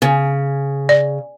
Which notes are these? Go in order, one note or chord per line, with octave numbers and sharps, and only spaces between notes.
C#3
D5